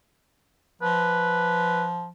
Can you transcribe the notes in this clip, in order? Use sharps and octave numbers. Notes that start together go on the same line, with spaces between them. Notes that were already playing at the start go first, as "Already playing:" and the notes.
F3 B4